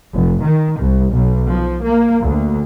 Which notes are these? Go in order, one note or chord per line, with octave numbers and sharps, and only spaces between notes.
F1
D#3
C2
B1
F3
A#3
D2